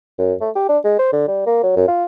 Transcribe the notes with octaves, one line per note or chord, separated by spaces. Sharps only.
F#2
A3
G4
D4
G#3
C5
D3
G3
A#3
F#3
F#2
F4